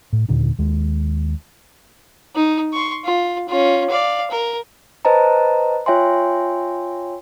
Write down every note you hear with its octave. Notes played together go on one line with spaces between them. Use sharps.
A2
D#2 A#2 D3 D#3
D#2 G#3
D#4
C6 C#6
F4
C#4 F4
D5 F5
A#4
B4 C5 D#5 A5 A#5
F4 C#5 E5 G5 G#5 C6